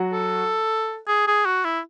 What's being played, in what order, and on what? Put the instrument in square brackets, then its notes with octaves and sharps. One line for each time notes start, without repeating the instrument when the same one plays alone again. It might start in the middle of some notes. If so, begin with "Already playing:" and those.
Already playing: [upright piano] F#3 F#4
[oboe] A4
G#4
G#4
F#4
E4